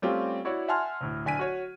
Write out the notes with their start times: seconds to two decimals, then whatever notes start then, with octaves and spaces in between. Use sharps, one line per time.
0.02 G3 A3 C4 C#4 F4 G4
0.45 E4 F#4 C#5 D5
0.68 E5 F#5 G#5 A5 C6 F6
1.01 D2 A2
1.25 D1 D3 G#5 B6 D#7
1.39 F#4 C#5